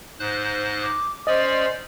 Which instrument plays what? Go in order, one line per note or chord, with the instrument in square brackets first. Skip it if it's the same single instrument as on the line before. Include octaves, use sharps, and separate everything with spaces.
[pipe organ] G#2 C5 F#6
[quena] D6
[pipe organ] C#4 D5 [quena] C5 [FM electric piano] D#5